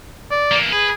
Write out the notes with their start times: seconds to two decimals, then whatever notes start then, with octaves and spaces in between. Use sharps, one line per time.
0.31 D5
0.51 E3 A#3
0.72 G#4 B4